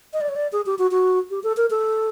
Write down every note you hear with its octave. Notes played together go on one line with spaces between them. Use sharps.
D#5
D5
C#5
D5
G#4
G4
F#4
F#4
G4
A4
A#4
A4